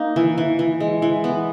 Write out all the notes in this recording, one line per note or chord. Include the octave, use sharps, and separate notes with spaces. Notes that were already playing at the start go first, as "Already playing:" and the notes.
Already playing: A#3 D#4
E3
E3
E3
G#3
E3
B3